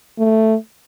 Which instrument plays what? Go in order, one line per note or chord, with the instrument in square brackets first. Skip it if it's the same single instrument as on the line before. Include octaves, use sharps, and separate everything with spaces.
[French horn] A3